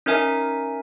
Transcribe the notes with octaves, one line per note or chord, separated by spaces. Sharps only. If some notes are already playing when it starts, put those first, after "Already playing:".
C#4 D#4 A#4 E5 G#5